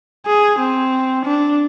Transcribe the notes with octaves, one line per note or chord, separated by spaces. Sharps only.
G#4
C4
D4